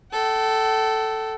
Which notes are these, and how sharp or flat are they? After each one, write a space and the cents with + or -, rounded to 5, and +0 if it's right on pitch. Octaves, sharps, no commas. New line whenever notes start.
A4 +0 G5 -45